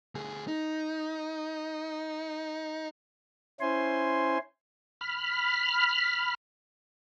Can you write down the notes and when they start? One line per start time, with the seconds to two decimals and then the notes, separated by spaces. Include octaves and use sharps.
0.15 D2 G#4
0.48 D#4
3.60 C#4 E4 C5 G#5 C6
5.01 B5 F6